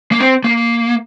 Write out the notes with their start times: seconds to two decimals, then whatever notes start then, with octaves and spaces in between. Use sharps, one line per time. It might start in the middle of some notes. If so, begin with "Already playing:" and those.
0.12 A#3
0.20 C4
0.44 A#3